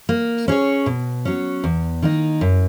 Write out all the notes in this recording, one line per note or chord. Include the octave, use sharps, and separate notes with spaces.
A#3
C#4 G#4 C#5
B2
F#3 C#4
E2
D#3 A#3 D#4
F#2